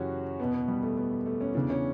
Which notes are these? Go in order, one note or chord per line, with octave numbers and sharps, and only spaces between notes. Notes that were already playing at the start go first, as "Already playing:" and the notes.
Already playing: F#2 C#3 E3 C#4 F#4 G4
E2 B2 B3
B3
G3
A3
B3
A3
C#4
E2 C#3 E3 D4
C#4